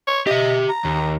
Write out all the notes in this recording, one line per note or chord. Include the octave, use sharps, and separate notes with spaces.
C#5
G4 D#5 E5
A#5
D#2